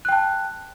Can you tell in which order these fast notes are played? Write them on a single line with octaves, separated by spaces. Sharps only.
F#6 G5 A5